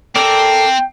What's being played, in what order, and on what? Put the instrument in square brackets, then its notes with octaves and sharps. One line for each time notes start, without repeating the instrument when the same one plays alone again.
[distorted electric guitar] C4 [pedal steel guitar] A4 A#4 D5 [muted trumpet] G5